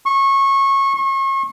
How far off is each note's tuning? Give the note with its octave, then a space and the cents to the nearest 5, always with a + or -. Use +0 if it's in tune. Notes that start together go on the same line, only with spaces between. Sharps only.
C#6 -20
C#6 -35